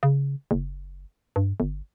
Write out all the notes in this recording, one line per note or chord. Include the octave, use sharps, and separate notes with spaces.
C#3
F#1
G2
G1